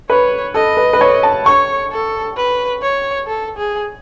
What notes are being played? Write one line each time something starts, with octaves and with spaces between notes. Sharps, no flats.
B4 C#5
A4 D#5
B4
B4
C#5
A5
C#5 C#6
A4
B4
C#5
A4
G#4